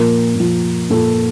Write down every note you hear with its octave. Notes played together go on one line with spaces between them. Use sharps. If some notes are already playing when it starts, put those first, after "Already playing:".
Already playing: A#2 F3 A#4
A#2 F3
A#2 F3 A4